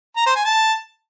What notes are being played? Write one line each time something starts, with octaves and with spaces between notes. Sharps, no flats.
A#5
C5
G#5
A5